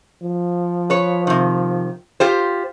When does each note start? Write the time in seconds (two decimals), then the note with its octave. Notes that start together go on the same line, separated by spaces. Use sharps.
0.23 F3
0.90 B4 C#5
1.27 C3 D#3
2.20 F4 G4 C5